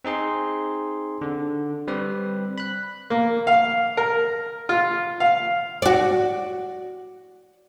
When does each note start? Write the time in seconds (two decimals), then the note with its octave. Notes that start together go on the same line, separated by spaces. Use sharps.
0.04 C4 D#4 G#4 C6
1.21 D3
1.88 G3 C4 G4 B4
2.58 B5 F#6
3.10 A#3
3.47 F5
3.97 A#4
4.69 F4
5.20 F5
5.82 F#4 D5